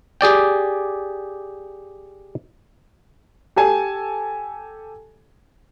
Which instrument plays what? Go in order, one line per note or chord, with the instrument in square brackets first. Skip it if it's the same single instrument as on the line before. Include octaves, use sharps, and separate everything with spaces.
[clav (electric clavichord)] G4 G#4 D5 G5
[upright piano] G4 A4 G#5 A5